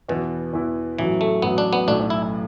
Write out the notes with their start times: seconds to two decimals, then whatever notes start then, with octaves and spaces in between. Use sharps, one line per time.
0.09 E2 B2 E3 B3 E4
0.53 E2 E3 B3 E4
0.98 A1 A2 E3 F#3
1.21 A3
1.42 A1 A2 F#3 B3
1.58 D4
1.73 B3
1.87 B1 A2 A3 D4
2.10 E4